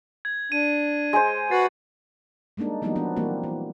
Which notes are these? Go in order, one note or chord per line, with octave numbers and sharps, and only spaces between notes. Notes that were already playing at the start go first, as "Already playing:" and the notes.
G#6
D4 D#7
G#3 C5
F#4 B4 F#5 A6 C7
G3 G#3 A#3 D4 D#4
E3 F#3 G3 A#3 B3 D#4
F3 B3 D4
E3 G3 A#3 C4 F#4
E3